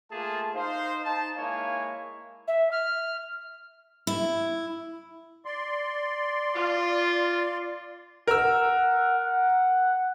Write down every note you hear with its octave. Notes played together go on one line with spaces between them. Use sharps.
A3 A#3 F4 G#4 A5
D#4 C5 F5
D#4 A5
G#3 A#3 E4 C#5 F5 G#5
E5
F6
E4
D5 C6
F4
A#4 F#5 E6
F#5